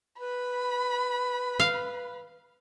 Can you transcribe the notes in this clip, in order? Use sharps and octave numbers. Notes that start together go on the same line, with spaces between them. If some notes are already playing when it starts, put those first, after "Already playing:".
B4 B5
F5